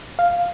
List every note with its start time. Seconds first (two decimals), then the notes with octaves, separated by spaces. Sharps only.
0.19 F5